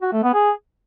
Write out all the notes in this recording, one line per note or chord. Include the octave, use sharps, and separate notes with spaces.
F#4
A3
B3
G#4